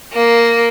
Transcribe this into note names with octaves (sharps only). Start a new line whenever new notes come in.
A#3